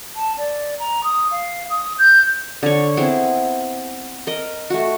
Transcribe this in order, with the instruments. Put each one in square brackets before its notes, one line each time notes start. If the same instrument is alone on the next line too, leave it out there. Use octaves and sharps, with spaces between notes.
[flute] A5
D5
A#5
D#6
F5
D#6
G6
[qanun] D3 C#5
B3 C4 E4 G#4
A#4 D#5
A3 F#4